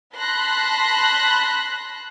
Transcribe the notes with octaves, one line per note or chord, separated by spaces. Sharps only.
A5 B5 C6 F#6 A#6